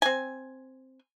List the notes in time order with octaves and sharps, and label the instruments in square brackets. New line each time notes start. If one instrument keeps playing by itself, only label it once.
[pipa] C4 G#5